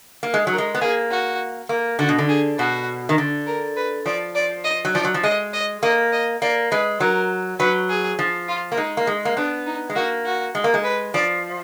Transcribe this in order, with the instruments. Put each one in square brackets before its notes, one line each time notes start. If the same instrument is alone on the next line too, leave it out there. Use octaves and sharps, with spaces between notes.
[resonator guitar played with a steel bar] A#3
G#3
F#3
[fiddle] A#4
[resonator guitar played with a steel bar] G#3
B3
[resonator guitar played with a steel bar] A#3 [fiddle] G#4
[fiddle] F#4
[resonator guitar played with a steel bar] A#3
[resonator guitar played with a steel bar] D3 [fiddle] F#4
[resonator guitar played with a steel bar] B2
D3
[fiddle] G#4
[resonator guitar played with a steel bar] B2 [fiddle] F#4
[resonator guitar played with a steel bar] D#3
D3
[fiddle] A#4
B4
[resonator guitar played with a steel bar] F3 [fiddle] D5
[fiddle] D5
D#5
[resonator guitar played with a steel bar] F#3
[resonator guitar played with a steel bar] F3 [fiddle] D5
[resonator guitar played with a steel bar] F#3
F3
[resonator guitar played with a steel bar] G#3 [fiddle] D#5
[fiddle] D#5
[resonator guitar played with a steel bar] A#3 [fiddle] D#5
[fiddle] D#5
[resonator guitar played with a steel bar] A#3 [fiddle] D5
[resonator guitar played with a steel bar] G#3 [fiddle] B4
[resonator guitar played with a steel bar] F#3 [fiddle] A#4
[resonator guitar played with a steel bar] F#3 [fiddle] B4
[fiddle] G#4
[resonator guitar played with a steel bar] F3
[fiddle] F4
[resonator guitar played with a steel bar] A#3
[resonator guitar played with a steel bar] G#3 [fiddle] D#4
[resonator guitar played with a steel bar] A#3
G#3
A#3
[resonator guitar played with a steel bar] B3 [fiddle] D4
[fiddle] D#4
[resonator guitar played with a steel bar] G#3
[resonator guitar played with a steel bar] A#3 [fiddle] F#4
[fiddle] F#4
[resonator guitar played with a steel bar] G#3
A#3
G#3
[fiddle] B4
[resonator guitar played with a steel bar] F3 [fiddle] D5